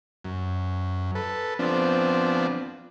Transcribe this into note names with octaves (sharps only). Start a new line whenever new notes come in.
F#2
A4 B4
F3 B3 C4 D4